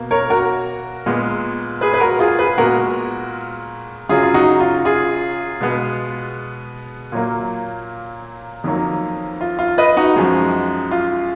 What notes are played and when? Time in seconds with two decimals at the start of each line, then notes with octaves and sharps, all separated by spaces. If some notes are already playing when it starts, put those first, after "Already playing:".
Already playing: B2 A#3
0.11 A#4 C#5
0.30 F#4 A#4
1.06 A#2 G#3 B3
1.81 G#4 B4
1.94 B4
2.00 F#4 A#4
2.19 F4 G#4
2.38 G#4 B4
2.57 A#2 G#3 B3 F#4 A#4
4.09 F#2 C#3 F#3 F4 G#4
4.23 F4
4.34 D#4 F#4
4.60 F4
4.85 F4 G#4
5.60 B2 G#3 B3
7.12 A#2 F#3 A#3
8.64 F2 D#3 F#3 A#3
9.41 F4
9.59 F4
9.78 B4 D#5
9.97 D#4 F#4
10.16 F#2 F3 G#3
10.91 F4